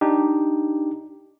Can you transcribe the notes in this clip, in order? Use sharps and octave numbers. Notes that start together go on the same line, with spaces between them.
D4 D#4 G4